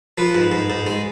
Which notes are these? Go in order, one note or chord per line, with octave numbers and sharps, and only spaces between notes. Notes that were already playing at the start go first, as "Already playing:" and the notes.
F3 B4
G#2
G#2
G#2
G#3